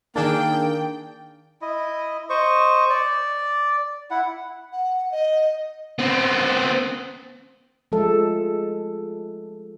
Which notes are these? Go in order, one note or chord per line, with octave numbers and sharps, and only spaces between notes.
D#3 A#3 D4 G#4 G5 A6
E4 D#5
C5 D#5 C#6
D5
E4 F#5
F#5
D#5
B3 C4
F3 G#3 A4